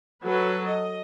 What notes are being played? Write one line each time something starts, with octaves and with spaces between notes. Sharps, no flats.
F#3 A4 B4
D#5